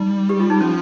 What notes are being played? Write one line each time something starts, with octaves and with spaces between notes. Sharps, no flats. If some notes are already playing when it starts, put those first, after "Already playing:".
Already playing: G3 D#4
G4
F4
D#4
F3 C#4